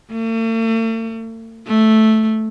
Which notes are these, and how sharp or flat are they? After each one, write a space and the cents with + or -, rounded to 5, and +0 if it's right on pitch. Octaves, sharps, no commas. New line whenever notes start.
A3 +45
A3 -5